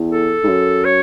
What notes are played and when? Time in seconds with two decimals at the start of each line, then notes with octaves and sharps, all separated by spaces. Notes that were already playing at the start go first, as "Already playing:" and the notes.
Already playing: E2
0.11 A4
0.43 G#2
0.48 F#2
0.85 C#5